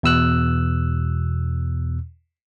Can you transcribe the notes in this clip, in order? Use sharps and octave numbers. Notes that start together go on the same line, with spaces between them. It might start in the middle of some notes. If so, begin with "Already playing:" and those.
E2 B2 E6 F#6